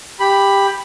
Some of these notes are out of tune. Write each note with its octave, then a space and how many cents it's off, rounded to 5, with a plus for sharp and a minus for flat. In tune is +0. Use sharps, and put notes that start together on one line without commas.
G4 +10 B5 +0